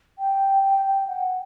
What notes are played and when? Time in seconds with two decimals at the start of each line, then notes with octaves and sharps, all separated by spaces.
0.19 G5
0.63 G5
0.86 G5
1.08 F#5